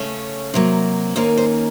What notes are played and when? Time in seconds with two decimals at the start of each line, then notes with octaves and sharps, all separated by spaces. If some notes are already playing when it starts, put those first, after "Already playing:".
Already playing: C#3 A3 C#4
0.54 C3 F#3 A#3
1.16 D#2 D#3 A#3 C#4 C5
1.37 C5